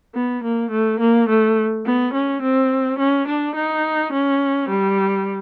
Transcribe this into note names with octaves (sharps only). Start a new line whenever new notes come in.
B3
A#3
A3
A#3
A3
B3
C#4
C4
C#4
D4
D#4
C#4
G3